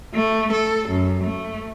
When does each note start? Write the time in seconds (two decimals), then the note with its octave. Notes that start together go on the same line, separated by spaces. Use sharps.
0.14 A3
0.52 A4
0.89 F#2
1.23 A3